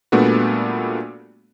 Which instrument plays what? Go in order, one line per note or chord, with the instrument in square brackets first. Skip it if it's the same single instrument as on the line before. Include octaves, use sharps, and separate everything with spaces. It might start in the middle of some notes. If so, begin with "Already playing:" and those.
[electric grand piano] A#2 G3 A3 B3 D4 F#4